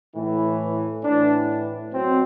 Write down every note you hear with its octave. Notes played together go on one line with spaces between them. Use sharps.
A2 E3
A2 E3 D4
B2 F#3 C4